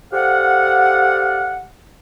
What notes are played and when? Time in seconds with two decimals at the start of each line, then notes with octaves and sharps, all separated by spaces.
0.13 G4 A4 C5 D5 F5 F#5